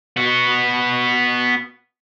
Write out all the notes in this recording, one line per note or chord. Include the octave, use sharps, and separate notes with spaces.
B3 F#4